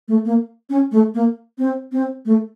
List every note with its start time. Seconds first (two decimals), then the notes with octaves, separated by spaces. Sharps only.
0.08 A3
0.25 A#3
0.70 C#4
0.92 A3
1.14 A#3
1.58 C4
1.92 C4
2.25 A3